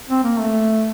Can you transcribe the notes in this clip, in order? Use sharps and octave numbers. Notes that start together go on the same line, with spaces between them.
C4
A#3
A3